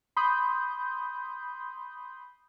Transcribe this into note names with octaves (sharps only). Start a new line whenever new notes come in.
B5 C6 D#6 G6